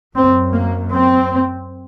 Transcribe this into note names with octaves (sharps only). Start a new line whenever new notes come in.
F#2 C4
A#3
C4